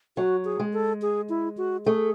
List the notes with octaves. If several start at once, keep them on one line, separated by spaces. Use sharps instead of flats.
F#3 F#4
G#4
G#3
A4
G#4
E4
F#4
A3 G#4